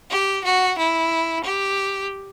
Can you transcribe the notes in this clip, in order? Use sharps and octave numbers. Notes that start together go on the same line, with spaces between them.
G4
F#4
E4
G4